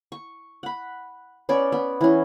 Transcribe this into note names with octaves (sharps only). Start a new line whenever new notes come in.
C#6
F#5 B5
B3 C#4 C#5 D5
B3
E3 C#4